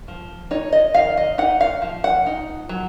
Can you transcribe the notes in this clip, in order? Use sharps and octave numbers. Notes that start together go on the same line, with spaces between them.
F3
D#4 C#5
D#5
D#3 F5
D#5
D#4 F#5
F5
F3
F#5
D#4
F#3